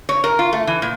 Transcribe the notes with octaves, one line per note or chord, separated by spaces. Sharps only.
C#5
A#4
F4
A3
E3
A#2